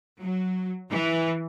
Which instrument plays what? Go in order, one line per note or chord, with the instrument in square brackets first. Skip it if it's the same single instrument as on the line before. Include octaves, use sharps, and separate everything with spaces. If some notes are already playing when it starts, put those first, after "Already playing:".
[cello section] F#3
E3